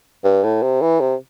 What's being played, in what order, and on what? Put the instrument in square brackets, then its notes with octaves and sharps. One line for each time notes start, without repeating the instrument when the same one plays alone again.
[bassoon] G2
A2
C3
E3
C3